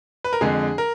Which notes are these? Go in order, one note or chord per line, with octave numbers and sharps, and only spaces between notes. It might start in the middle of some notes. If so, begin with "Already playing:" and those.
B4
A#4
F2 D3 G#3 G#4
A#4